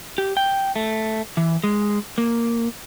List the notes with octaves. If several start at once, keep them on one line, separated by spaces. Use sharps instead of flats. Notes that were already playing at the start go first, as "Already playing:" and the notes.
G4
G5
A3
E3
G#3
A#3